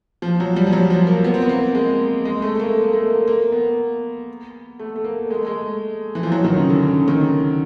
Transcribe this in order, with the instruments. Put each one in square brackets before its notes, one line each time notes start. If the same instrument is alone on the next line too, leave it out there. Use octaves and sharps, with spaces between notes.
[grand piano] F3
F#3
G3
F3
F#3
F3
A#3
B3
C4
B3
A#3
G#3
G#3
A3
A3
A#3
A#3
A3
A#3
A#3
B3
A3
A3
A#3
G#3
A3
G#3
E3
F3
F#3
D#3
C#3
D3
C#3
D#3